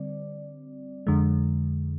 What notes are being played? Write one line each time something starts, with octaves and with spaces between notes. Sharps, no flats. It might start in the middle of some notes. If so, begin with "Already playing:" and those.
Already playing: D3 G3 C4 D5
F2 D3 G#3